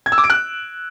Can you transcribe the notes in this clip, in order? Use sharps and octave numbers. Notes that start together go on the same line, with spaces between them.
G#6
E6
D6
D7
F#6